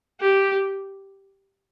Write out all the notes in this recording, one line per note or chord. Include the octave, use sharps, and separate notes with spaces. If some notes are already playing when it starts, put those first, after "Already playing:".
G4